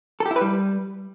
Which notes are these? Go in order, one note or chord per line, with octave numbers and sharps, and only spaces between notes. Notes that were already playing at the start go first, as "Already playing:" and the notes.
A4
G4
E4
B4
G3